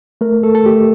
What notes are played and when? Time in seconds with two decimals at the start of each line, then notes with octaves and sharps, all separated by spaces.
0.21 A3 A#4
0.43 A3 A4
0.55 A4
0.65 A3 G4